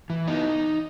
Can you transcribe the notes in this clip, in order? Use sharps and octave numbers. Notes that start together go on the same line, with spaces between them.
E3
B3 D#4